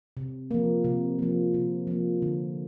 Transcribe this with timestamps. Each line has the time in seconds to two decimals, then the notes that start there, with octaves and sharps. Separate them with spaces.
0.17 C3
0.51 F3 A#3
0.84 C3
1.19 F3 A#3
1.54 C3
1.87 F3 A#3
2.22 D3